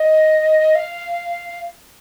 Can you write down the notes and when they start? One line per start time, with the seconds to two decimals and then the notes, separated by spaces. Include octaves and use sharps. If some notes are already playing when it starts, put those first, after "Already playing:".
Already playing: D#5
0.75 F5